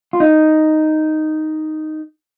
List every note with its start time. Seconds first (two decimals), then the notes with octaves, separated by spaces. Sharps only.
0.13 F4
0.20 D#4